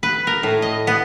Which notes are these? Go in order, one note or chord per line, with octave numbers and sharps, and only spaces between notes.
B4
A#4
A2
D#5
B3